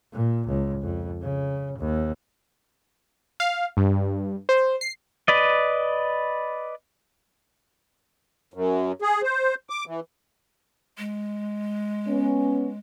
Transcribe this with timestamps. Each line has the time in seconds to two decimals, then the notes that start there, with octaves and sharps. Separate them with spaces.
0.13 A#2
0.48 C#2
0.82 F2
1.22 C#3
1.79 D#2
3.40 F5
3.77 G2
4.49 C5
4.81 C7
5.28 B4 D5 D#5
8.54 F#2
9.02 G#4
9.23 C5
9.70 D6
9.87 E3
10.98 G#3
12.07 B3 C#4